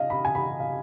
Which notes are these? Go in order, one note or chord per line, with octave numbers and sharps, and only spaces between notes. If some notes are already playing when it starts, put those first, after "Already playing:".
Already playing: D#5 F5
B5
G#5
B5
F5